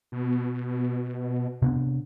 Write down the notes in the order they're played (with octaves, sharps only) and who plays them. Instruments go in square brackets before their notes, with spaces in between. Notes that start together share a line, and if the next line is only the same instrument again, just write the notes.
[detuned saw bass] B2
[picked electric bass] C3 B3 D4